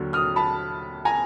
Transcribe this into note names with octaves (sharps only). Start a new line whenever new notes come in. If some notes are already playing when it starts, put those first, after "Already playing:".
Already playing: D#2 D3 F#3
D#6 F6
A5 B5
G#5 A#5